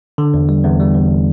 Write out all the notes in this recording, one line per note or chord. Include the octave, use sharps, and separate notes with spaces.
D3
E2
G3
E2
G3
E2